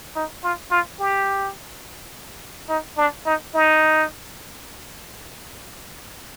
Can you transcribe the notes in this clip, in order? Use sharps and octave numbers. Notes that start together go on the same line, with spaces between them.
D#4
F4
F4
G4
D#4
D4
D#4
D#4